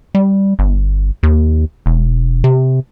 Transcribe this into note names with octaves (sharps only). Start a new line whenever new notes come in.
G3
G1
D#2
E1
C3